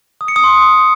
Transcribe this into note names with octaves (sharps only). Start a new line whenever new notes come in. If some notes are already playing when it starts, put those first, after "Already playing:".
D#6
C#7
D#6
C6